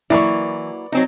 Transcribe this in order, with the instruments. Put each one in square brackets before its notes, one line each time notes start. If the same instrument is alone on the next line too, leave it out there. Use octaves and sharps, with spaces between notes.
[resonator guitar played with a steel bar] E3 [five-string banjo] F#3 A#3 E4 [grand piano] D5 C#6
[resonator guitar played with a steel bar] F#3 C4 D#4